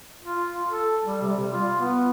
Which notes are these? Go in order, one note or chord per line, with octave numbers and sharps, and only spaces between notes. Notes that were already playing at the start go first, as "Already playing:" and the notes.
F4
A4
G3
C3
G3
F4
B3